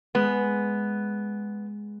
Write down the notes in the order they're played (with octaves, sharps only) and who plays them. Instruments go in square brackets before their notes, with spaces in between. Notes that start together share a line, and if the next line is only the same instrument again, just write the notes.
[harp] G#3 [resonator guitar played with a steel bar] B3